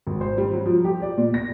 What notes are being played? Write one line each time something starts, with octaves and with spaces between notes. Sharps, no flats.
G#1
C5
G3
F#3
F3
G4
D5
A#2
A#6